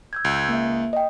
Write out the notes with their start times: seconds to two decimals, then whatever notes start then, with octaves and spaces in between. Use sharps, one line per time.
0.13 E6 G6 G#6
0.25 C#2
0.49 A#3 E5
0.93 D#5 G5